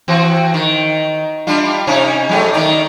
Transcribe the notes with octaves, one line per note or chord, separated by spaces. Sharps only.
E3 C4 F#4
D#3
G3 D4 F4
C3 C#4 D#4
F#3 G#3 A3
D#3 D#4 D5